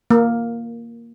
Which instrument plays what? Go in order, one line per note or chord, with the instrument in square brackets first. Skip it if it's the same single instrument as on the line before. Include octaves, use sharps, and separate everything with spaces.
[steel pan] A#3